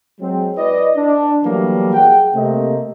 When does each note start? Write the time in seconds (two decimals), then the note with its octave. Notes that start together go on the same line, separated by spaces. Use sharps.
0.19 F#3 G#3 C4
0.56 E4 B4 D5 D#5
0.95 D4
1.43 E3 F#3 G3 A3 A#3
1.93 G#4 F#5 G5
2.34 C3 A3 A#3 C4 D#5